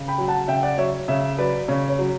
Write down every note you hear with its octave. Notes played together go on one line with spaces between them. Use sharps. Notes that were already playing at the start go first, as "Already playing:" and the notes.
Already playing: C#3
G5 B5
F#3
F#5 A5
C#3 E5 G5
D5 F#5
F#3 C#5 E5
C#3 C#5 E5
F#3 B4 D5
C#3 C#5
C#5
F#3